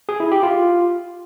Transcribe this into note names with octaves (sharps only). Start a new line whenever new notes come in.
G#4
E4
G4
F4